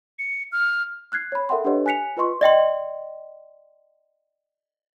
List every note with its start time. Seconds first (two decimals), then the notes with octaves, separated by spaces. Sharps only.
0.19 C#7
0.52 F6
1.12 F6 F#6 G#6 C7
1.32 C#5 B5
1.49 A4 A#4 E5 F#5 G5 C6
1.64 D4 G4 A4 B4 C#5 D#5
1.86 G#5 F#6 B6 C#7 F7
2.17 F4 B4 D#5 C6 C#6
2.41 D5 D#5 G5 C6